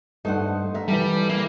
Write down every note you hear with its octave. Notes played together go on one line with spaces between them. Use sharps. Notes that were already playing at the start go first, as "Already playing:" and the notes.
G2 A3 D#4 C5 F#5
A#4 E5
E3 G3 A4
A#3 E5